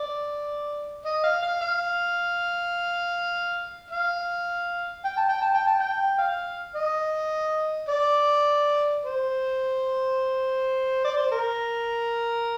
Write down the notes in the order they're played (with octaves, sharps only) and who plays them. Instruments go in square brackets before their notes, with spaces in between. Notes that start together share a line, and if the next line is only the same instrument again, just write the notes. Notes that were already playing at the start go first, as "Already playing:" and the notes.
Already playing: [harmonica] D5
D#5
F5
F5
F5
F5
G5
A5
G5
A5
G5
A5
G5
F5
D#5
D5
C5
D5
C5
A#4